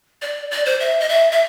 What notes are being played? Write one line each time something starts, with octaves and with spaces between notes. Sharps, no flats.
D5
D5
C5
E5
D#5
E5
E5